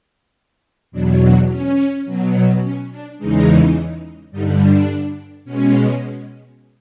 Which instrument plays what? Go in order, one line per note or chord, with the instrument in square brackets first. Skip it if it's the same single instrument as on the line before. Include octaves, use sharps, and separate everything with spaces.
[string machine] E2 B2 F#3 D4
D4
C#4
B2 F#3
C#4
D4
E2 C#3 E3 G#3 D#4
G2 D3 G3 D#4
D4
B2 G#3 C#4